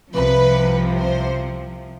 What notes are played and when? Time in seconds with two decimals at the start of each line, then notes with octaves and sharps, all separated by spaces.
0.13 C2 C3 F3 B4
0.98 C5